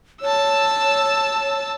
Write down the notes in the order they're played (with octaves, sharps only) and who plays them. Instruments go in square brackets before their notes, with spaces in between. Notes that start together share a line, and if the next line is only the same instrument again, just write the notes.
[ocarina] C#5 [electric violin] A5 E6